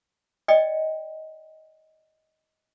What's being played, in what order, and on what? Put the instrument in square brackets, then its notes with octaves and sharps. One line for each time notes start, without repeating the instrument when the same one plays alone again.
[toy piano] D5 D#5 G5